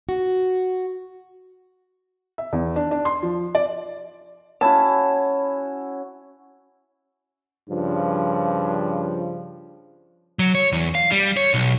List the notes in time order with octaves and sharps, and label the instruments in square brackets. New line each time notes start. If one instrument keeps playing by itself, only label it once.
[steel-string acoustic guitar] F#4
[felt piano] E5
E2
D4
D4
C6
F3
D5
[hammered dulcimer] C#4 E4 F#4 [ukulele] A5
[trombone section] G2 C#3 F3
[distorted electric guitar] F#3
C#5
E2
F5
G3
C#5
B1